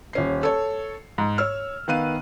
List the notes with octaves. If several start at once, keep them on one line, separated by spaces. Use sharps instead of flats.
D#1 C#4 C7
A4 C#5
G#2
C#5 E6 F6
D#3 B3 F5 F#6 D#7